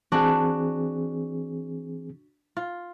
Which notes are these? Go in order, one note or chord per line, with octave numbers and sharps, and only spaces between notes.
E3 C4 D4 F#4 G#4
F4